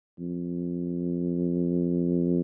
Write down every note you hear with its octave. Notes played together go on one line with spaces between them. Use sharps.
F2